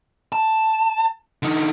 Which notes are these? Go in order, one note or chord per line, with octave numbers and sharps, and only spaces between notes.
A5
D3 D#4